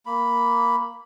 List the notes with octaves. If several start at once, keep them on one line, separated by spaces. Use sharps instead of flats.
A#3 B5